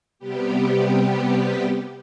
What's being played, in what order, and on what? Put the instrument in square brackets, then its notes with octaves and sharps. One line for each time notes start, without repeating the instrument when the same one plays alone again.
[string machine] C3 G3 B3 G4